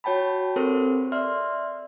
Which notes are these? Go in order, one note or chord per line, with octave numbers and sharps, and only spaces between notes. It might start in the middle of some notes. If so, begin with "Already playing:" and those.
F#4 C#5 G5 A5 B5
C4 G4 A4 A#4 C5
D5 E5 C6 F6